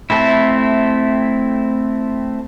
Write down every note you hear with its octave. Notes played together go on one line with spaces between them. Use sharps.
A3 C4 E4